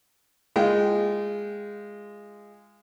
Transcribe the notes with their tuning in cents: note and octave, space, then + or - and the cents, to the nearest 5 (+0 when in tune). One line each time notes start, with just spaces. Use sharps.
G#3 -10 F4 -20 G5 -30